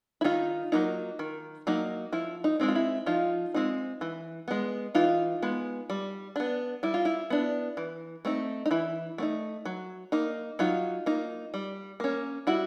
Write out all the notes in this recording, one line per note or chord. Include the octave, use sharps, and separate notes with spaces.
E4
D#3 D#4 F4
F#3 A#3 D#4
D#3
F#3 A#3 D#4
F3 E4
D#4
G#3 C4 D#4
F4
E4
F3 D#4 F4
G#3 C4 D#4
E3
G#3 B3
E3 D#4 F4
G#3 B3
G3
B3 D4
G3 E4
F4
E4
B3 D4
E3
A3 C4 D#4
D#4
E3 E4
A3 C4 D#4
F#3
A#3 D#4
F#3 D#4 F4
A#3 D#4
G3
A#3 C#4
G3 E4 F#4